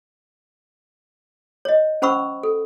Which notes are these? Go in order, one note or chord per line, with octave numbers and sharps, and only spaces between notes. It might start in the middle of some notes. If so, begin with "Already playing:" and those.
C#5 D#5
C#4 C5 F#5 B5 C#6 E6
A4